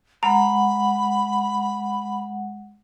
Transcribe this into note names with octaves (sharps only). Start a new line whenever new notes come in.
G#3 F#5 A#5 B5